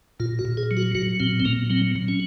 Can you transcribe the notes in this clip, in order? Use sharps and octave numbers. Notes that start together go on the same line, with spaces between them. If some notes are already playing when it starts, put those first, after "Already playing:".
A#2 F4
F#4
A#2
G#4
F#3
F#4
F#3 F#4
A#2 C4
C4
A#2 A#3
F#3 C4
F#3
C#4